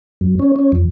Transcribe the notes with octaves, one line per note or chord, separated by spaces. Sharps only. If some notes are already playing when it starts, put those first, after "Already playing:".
F#2
C#4
C#4
F2